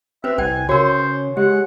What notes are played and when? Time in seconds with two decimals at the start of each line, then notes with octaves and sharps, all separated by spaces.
0.24 C4 B4 C5 E5
0.38 C2 C5 G5 G#5
0.69 C#3 F#4 A#4 C5 C#5
1.37 G#3 G4 F#5